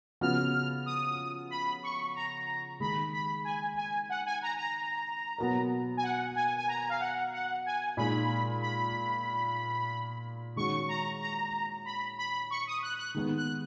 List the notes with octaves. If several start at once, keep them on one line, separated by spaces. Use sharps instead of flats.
C#3 F3 B3 F#4 F6
D#6
B5
C#6
A#5
D#3 G#3 D#4 B5
B5
G#5
G#5
F#5
G#5
A#5
A#5
B2 F#3 B3 F#4 A#4
G#5
F#5
G#5
G#5
A#5
F5
F#5
F#5
G#5
A#2 G#3 D#4 B5
B5
D#3 G#3 C#4 F#4 C#6
A#5
A#5
B5
B5
C#6
D#6
F#6
F#6
D#3 G#3 B3
F#6